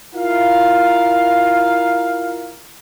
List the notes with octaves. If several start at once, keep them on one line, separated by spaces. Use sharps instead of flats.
E4 F4 A#4 F5